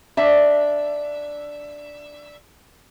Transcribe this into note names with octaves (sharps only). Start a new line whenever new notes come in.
D4 E5